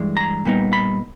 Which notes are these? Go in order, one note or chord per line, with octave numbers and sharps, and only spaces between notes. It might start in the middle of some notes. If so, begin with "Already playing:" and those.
Already playing: G2 E3 G#3
A#5
A#2 G3 B3 D#4
B5